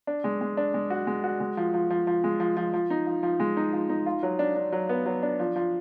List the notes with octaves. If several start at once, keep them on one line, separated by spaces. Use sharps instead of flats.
D4
G#3
G#3
D4
G#3
F#4
G#3
F#4
G#3
F3
F3
F3
F3
G#3
F3
F3
F3
D#4
F3
F3
G#3
D#4
F3
D#4
F4
F#3
D4
D4
F#3
B3
F#3
D4
F3
F3